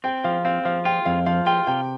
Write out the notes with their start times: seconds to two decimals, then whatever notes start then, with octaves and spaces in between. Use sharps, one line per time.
0.04 C4 G5
0.24 F3 F5
0.45 C4 F5
0.65 F3 F5
0.85 F4 G5
1.05 F2 F5
1.26 F3 F5
1.46 F4 G5
1.67 C3 G5